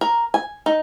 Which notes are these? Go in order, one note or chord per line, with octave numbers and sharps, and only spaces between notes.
A#4
G#5
D#4